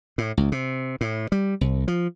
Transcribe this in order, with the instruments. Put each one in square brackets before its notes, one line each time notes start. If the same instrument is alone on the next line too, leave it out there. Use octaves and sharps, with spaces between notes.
[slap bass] A2
C#2
C3
A2
G3
C2
F3